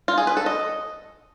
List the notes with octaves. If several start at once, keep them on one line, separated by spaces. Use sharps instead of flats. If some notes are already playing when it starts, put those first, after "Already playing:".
F4
G#4
B4
A4
D#5